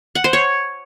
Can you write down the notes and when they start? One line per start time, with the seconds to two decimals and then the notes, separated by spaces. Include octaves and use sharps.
0.15 F#5
0.24 C5
0.33 C#5